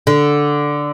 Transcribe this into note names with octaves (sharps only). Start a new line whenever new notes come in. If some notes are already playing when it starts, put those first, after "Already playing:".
D3